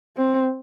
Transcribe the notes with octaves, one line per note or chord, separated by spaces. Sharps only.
C4